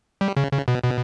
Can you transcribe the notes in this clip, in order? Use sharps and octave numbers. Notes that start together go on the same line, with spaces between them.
G3
C#3
C#3
B2
B2